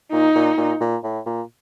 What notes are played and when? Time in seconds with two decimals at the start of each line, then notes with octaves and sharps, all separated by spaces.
0.12 A#2 D#4
0.35 A#2
0.57 A#2
0.81 A#2
1.04 A2
1.26 A#2